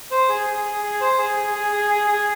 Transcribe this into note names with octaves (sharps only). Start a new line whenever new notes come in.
C5
G#4
G#4
G#4
G#4
C5
G#4
G#4
G#4
G#4
G#4
G#4